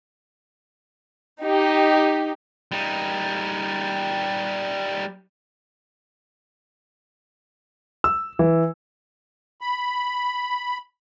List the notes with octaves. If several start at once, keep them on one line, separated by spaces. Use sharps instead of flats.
D#4 G4
G3 D#4
E6
E3
B5